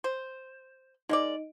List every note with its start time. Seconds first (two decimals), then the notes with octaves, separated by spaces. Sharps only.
0.04 C5
1.09 G#3 A#3 D#4 D5 D#5